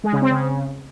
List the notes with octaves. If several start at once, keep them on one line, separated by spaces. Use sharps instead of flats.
G#3
C#3
C4
C#3